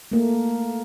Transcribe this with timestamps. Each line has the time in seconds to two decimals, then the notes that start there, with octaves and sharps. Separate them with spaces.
0.11 A3 A#3